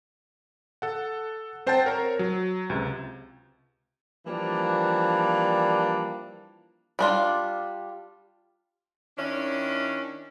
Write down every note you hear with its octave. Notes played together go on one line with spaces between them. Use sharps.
A4 F#5
C4 C5 F#5 G5 A5 A6
A#4 C#5 A#5
F#3
C#2 C3
E3 F3 G3 A#3 D4
G3 D4 F4
D#3 C#4 D4 E4